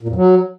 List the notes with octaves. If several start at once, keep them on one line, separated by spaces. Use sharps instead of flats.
A#2
F2
F#3